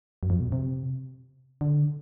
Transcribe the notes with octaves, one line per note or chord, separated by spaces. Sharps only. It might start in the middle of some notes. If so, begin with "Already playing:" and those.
F#2
F2
B2
C3
D3